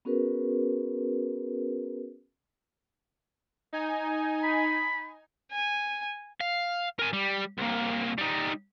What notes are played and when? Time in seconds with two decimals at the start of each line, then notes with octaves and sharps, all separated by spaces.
0.05 B3 C#4 F#4 G#4 A#4 B4
3.73 D#4 G#5
4.43 B5
5.52 G#5
6.40 F5
6.99 A#4 G#5
7.13 G3
7.58 C2 A#3
8.18 G3 D#4